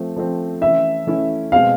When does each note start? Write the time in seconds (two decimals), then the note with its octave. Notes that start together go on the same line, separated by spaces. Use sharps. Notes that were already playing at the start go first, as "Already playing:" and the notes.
Already playing: F3 A3 C4
0.16 F3 A3 C4
0.61 E3 A3 C#4 E4 E5
1.07 E3 A3 C#4 E4
1.52 B2 G#3 C4 F5